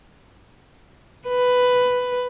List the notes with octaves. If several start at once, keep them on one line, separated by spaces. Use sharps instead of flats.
B4